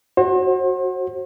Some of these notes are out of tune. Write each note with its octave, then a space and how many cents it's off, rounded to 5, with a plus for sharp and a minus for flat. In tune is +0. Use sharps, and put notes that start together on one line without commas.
F#4 +0 C5 +40